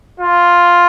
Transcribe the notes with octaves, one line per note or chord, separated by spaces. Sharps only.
F4